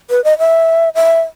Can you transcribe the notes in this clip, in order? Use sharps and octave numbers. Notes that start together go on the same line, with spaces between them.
B4
D#5
E5
E5